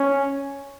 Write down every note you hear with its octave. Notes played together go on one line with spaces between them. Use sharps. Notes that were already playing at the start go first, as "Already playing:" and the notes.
Already playing: C#4